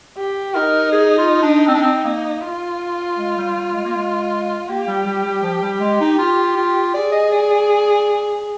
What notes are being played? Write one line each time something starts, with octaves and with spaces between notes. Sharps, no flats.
G4
D#4 A#4
G#4
F4
D4
C4
D4
C4
A#3
F4
G#3
G3
G3
G#3
A#3
G#3
A#3 G4
G3
G3
G3
F3
G3
G#3
D#4
F4
F4
G#4 D5
D#5
D5
D5